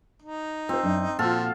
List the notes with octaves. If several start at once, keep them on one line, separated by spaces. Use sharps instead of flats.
D#4
C4 F4 C5
F#2 D4
A#2 F3 F4 F#4 A4